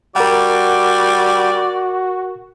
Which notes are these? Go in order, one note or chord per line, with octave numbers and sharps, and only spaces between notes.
G3 F#4 A#4 D5 F#5